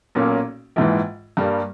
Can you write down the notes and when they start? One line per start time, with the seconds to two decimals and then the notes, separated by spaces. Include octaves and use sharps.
0.15 B1 A#2 A#3 C#4
0.76 A#1 G#2 E3
1.37 G2 G3 A#3